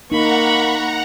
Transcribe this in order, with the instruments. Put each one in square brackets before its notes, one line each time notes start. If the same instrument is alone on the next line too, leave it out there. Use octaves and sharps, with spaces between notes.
[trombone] A#3 [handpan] D#4 [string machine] F#5 A#5 [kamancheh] B5 C#6